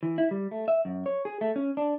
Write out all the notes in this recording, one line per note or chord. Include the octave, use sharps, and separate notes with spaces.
E3
E4
G3
A3
E5
F#2
C#5
G#4
A3
C#4
D4